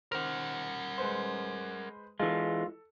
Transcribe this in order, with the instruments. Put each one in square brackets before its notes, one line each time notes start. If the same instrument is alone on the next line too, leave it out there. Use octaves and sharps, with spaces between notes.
[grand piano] D#3 C5 [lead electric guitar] A#4 F#5 [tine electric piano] F6
[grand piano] G#3 B4 C5
[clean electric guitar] E3 G#3 [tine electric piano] F4 [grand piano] A4